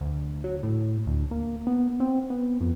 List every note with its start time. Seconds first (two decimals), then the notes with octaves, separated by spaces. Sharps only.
0.01 D2
0.44 F#3
0.63 A2
1.06 D2
1.31 A#3
1.67 B3
2.00 C4
2.30 B3
2.61 F2